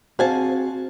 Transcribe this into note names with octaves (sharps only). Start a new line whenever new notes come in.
C4 F#4 G#4 C5 F5 G#5 A5